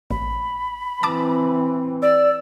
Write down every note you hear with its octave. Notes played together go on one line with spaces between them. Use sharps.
A1 B5
E3 C4 A5 D6
D5 E6